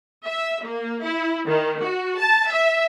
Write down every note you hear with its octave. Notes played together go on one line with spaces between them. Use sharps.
E5
A#3
E4
D#3
F#4
A5
E5